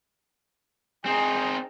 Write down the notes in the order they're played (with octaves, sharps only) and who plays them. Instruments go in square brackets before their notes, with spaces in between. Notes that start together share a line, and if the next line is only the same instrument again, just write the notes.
[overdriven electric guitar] C4 D#4 [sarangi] G#4